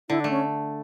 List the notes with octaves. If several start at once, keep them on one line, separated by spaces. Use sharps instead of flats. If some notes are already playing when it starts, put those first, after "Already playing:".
D3 E4
A3 D4
C#4